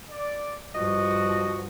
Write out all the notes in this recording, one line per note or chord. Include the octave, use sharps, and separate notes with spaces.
D5
G2 F3 F#4 D#5